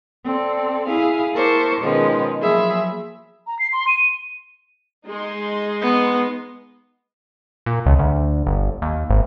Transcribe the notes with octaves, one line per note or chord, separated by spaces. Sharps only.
C4 A4 D5
E4 G#4 F5
E4 A#4 C5 A5 C#6 D6
B2 D#3 F3 G#3 C#4 B4
F3 F#3 A#3 G#4 E5 B5
A#5
C7
C6
D#7
G#3 D#4 C6
B3
A#2
C#2
D2
G1
D#2
G#1